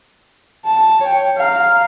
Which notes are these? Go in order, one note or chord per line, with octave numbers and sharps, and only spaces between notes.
A5
C#5 G5
F5 A#5